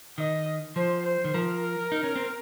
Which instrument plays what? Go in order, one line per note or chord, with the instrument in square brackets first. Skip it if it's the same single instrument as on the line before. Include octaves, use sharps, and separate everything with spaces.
[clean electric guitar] D#3 [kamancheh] D#5
[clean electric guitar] F3 [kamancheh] C5
[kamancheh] C5
[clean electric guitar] D#3
[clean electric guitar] F3 [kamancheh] A#4
[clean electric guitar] D#4
C#4
C4